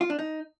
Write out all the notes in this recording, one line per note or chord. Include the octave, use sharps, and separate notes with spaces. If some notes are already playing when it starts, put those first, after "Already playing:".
F4
D4
D#4